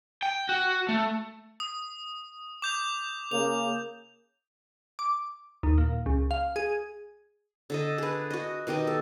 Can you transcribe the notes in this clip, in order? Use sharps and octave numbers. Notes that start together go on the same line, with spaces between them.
G5
F#4
A3
D#6
D6 G6 F7
C#3 A#3 F7
D6
D#2
A#2
C#2
F5
G#4
D3 A4 D#5
G#4 B4
F#4 D#5
B2 D#3 G4 D#5
A4